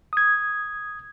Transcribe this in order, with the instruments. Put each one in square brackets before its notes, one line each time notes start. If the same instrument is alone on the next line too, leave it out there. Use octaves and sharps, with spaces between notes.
[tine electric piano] D#6 G#6